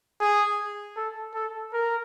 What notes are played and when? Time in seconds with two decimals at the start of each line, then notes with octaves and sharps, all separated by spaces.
0.21 G#4
0.97 A4
1.35 A4
1.73 A#4